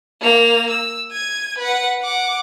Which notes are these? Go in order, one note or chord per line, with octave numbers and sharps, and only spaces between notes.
A#3 F7
E6
G#6 D#7
B4 F#5
F#5 D6